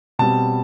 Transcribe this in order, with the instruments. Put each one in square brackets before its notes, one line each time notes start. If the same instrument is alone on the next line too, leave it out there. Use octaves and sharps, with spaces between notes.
[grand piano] B2 G3 C4 A5